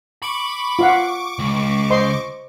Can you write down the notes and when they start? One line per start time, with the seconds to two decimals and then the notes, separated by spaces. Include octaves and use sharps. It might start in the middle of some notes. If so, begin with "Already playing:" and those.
0.22 B5 C#6 D6
0.79 F4 F5 F#5
1.39 C#2
1.90 C5 D#5 C6